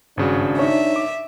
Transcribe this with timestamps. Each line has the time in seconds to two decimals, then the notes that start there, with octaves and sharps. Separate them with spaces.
0.17 G#1 G2 C#3 D4 F#4
0.59 D#4 C#5 E5
0.96 D6